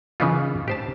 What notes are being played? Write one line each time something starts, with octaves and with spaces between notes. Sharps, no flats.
C#3 E3 B3 D#4 F4
G4 C5 A5